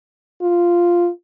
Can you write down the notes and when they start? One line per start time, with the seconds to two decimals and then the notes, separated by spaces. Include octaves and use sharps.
0.42 F4